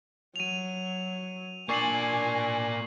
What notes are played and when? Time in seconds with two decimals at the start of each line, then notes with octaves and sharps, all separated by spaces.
0.36 F#3 D#7 F7
1.69 A#3 D4 D5 G#5 C#6 C7 F#7